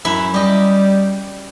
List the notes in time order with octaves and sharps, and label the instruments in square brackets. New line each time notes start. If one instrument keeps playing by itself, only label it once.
[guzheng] F#2 E4 E5
[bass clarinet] G3 [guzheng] G4 D#5